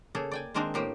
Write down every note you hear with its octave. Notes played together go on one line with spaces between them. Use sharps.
C#3 A#3 G#4 A4
D5 G5 G#5
D#3 G#3 A#3 C4 D4 D#4
A2 A#3 G4 C5